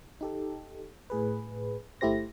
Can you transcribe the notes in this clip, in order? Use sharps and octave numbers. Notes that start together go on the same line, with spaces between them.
D#4 G4 A4
A2 G#4 B4
G1 A3 E4 G4 C5 A#6